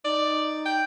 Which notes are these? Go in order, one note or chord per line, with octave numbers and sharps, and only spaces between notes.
D#4 D5
G5